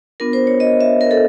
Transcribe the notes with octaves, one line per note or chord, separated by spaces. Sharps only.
B3 D4 F4 A#4
C5
C#5
D#5
E5
A#4
A4